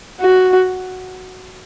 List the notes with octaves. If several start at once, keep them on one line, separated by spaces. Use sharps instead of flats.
F#4